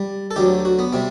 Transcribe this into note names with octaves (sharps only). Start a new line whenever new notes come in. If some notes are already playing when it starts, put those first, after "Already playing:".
Already playing: G3
A4
D2 D3 F#3 G4
F#4
B3
C3 G3 C4